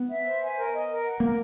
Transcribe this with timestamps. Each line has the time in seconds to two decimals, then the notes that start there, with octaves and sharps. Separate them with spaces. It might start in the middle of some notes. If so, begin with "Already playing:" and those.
Already playing: B3
0.09 E5
0.25 C5
0.41 G#5
0.57 A#4
0.73 D#5
0.88 A#4
1.05 F#5
1.20 A#3 A#4